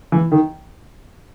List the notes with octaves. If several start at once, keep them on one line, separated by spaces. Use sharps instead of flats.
E3
D#3